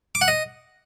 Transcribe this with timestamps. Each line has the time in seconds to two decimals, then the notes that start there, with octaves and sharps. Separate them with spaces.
0.15 D6
0.21 F#5
0.28 D#5